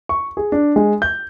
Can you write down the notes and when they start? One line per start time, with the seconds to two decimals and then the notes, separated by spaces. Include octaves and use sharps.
0.09 C#6
0.37 G#4
0.52 D4
0.76 G#3
1.02 G6